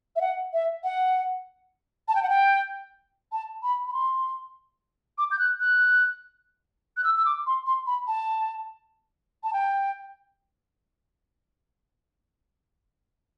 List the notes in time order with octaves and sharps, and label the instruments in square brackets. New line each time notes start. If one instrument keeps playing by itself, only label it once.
[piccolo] E5
F#5
E5
F#5
A5
G5
F#5
G5
A5
B5
B5
C6
D6
G6
F#6
F#6
F#6
E6
E6
D6
C6
C6
B5
A5
A5
G5